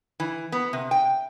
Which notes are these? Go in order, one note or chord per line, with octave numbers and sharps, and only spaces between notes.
E3
B3
C3
G5